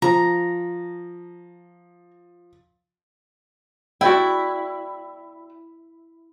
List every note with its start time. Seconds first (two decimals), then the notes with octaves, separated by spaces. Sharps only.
0.02 F3 A#5
4.01 E4 F#4 D5 G5